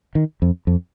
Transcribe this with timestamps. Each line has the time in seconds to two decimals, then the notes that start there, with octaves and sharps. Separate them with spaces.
0.15 D#3
0.42 F2
0.67 F2